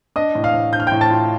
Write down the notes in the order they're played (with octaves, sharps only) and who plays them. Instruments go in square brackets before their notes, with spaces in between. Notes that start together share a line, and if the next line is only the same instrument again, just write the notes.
[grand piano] D4 D#5 D#6
A2
F5 F6
A2
D4 G6
F6
A2 G5 G6
A5 A6
F4